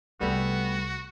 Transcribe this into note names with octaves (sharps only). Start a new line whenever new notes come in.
C2 G3 A3 B3 C4 F#4